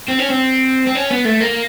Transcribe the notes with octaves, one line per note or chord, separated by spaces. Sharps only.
C4
C#4
C4
C4
C#4
B3
A3
A#3